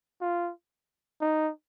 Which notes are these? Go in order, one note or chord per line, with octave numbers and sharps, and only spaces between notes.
F4
D#4